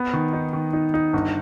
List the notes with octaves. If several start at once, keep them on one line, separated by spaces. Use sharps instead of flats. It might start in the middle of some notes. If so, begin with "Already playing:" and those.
Already playing: B3
D#3
D#4
D#3
D#4
D#4
G1